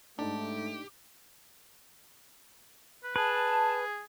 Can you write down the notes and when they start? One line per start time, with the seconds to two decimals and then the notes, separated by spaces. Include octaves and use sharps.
0.19 G#2 A3 D4 D#4 G4 A5
3.04 B4
3.16 G#4 B4 A5